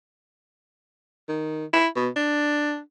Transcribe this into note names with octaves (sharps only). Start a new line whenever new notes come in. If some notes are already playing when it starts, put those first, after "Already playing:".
D#3
E4
B2
D4